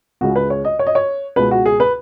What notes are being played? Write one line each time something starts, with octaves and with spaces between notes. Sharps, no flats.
C#2 C#3 G#3 F#4
B4
C#5
D#5
C#5
D#5
C#5
C#2 B2 G#3 B4
F#4
G#4
B4